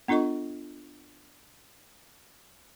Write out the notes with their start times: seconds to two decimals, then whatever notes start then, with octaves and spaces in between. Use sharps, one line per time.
0.08 B3 D4 F4 A4 D#5 C#6